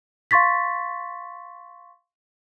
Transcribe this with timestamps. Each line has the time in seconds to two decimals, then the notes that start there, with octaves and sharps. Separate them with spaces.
0.31 F5 C6 C#6 A6 B6